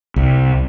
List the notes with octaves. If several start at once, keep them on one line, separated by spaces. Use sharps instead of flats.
C2